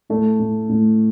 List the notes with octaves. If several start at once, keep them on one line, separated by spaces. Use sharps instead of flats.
A2 A3
A2
A2